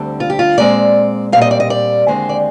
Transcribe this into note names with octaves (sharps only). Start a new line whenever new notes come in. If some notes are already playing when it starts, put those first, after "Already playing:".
Already playing: D2 D3 G3 C4
F4
G4
F4
A#2 G#3 C4 D5
A#2 G3 C4 F5
D#5
D5
D#5
D5
D#2 D3 G#3 C4 C5
D5